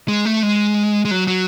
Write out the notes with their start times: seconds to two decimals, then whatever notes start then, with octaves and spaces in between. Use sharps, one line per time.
0.08 G#3
0.25 A3
0.43 G#3
1.05 G#3
1.11 F#3
1.27 F#3